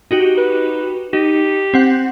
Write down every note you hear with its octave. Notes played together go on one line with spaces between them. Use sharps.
D#4 F#4 G4
B4
D#4 G4
C4 F#5